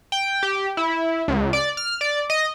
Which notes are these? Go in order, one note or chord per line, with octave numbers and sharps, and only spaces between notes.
G5
G4
E4
C#2
D5
F6
D5
D#5